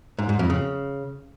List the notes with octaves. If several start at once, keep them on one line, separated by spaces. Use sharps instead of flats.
G#2
G#2
F2
C#3